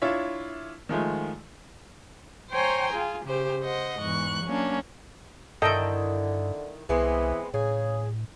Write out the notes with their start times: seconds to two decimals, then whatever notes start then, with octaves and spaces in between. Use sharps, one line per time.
0.02 D4 E4 F4 C#5 E5
0.89 D#3 F3 G#3 A3
2.51 C5 C#5 G5 G#5 A#5 C6
2.92 F4 G#4
3.25 C#3 G4 C5
3.62 C5 D#5 F#5
3.99 E2 G#2 C#6 F#6
4.44 F#3 A#3 C#4 D4
5.62 G2 D3 D#3 E4 A4 D#5 G5 A#5
6.89 C2 E3 G#3 B3 C4
7.54 A2 C#3 G#4